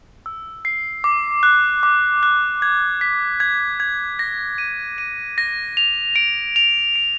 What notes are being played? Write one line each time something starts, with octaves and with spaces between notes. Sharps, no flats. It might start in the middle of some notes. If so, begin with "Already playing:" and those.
E6
C7
D6
F#6
D6
F#6
G#6
B6
G#6
G#6
A#6
D#7
D#7
A#6
F7
D7
F7
D7